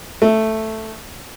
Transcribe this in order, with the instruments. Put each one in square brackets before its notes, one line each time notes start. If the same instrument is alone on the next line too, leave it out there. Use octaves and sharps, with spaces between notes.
[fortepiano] A3